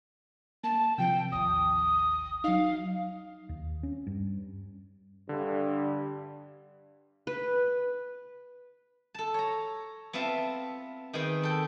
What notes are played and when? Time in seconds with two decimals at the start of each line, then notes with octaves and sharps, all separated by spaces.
0.64 A#3 A5
0.98 C3 F3 G5
1.32 A1 D#2 D#6
2.44 F#3 D#4 F5
3.49 D#2
3.83 C#4
4.07 G2
5.29 G2 D3
7.27 B4
9.15 A4 A5
9.34 C#5 A#5
10.13 B3 C4 F4 E5 A5
11.13 D#3 B3 C4 G#4 G5
11.43 A4 G5